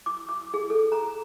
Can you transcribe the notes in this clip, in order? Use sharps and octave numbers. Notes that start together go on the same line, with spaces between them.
D6
D6
G#4
A4
A#5